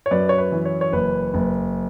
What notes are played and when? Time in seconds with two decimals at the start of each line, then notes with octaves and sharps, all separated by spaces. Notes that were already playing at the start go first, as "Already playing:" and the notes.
0.06 C#5
0.11 F#2 B4 D5
0.29 C#5
0.38 B4
0.52 E3
0.65 C#5
0.81 C#5
0.92 F#1 B4
1.34 F#1